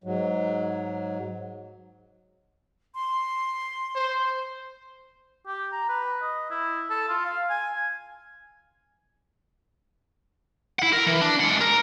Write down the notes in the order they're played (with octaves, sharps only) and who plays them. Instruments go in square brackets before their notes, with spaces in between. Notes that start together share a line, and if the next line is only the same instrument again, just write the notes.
[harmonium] G#2 F#3
[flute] C6
[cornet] C5
[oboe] G4
A#5
B4
D#5
E4
A4
F4
F5
G#5
[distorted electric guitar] E4 F#5
A#4
E3
D4
G#3 F#5
A#4